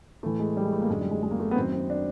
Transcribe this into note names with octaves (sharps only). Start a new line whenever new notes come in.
A2 E3 A3
G#3
G3
G#3
A3
A#3
F#2 D3 G#3
G3
G#3
G#3
A#3
A3
B3
F#2 D#3 C4
C4
D4